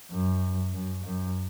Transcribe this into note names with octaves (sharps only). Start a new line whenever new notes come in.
F#2
F#2
F#2